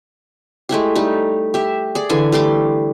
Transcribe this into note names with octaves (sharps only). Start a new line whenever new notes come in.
G#3 A3 E4 G4
G3 A3 D#4
G4 E5
G#4 D5
D3 E3 A4 G#5
G3 A3 C6 D6